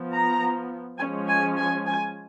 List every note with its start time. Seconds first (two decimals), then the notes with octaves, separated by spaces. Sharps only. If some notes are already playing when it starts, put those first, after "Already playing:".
Already playing: F3 B3
0.13 A#5
0.99 F3 G#3 C#4 G#5
1.28 G#5
1.57 G#5
1.86 G#5